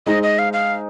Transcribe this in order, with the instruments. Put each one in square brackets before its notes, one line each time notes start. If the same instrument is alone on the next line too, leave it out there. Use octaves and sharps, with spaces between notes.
[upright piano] G#3 D#4 C5 [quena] D#5
[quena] D#5
F5
F5